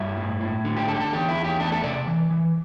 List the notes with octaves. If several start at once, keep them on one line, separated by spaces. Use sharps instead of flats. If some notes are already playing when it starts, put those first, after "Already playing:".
Already playing: G2 G3 E4
A2
A2
D3
G4
D3 A4
G4
A4
E2 G4
E4
E2
G4
A3 D4
A4
C3 D5
E3
E3